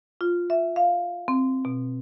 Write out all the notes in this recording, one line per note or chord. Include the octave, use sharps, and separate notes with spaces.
F4
E5
F5
C4
B2